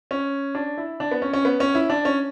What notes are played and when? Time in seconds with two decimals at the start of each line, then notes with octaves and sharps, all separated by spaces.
0.11 C#4
0.55 D4
0.77 E4
1.00 D4
1.11 B3
1.22 C#4
1.33 C#4
1.45 B3
1.60 C#4
1.75 E4
1.90 D4
2.05 C#4